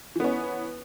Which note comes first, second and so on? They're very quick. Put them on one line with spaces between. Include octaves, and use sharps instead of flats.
E3 B3 C#4